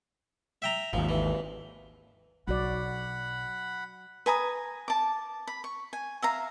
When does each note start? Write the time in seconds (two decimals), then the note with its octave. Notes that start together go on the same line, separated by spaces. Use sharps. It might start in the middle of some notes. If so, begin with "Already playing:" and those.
0.62 E5 G5 A#5
0.93 G#1 D#2 F3
1.09 E3
2.47 B1 F#3 F#4 D5 F#5 B5
4.26 B4 G#5 A#5 D#6
4.88 A5 D6
5.47 B5
5.64 C#6
5.93 G#5
6.22 E5 F5 A#5